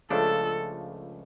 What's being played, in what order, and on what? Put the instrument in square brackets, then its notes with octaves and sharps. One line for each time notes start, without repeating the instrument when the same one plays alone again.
[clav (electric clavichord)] C#2 C#3 F3 A3 D4 [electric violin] A4